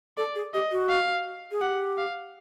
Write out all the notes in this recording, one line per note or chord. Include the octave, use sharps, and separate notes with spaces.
A4 D5
G#4
G4 D#5
F#4
F5
G#4
G4 F#5
F5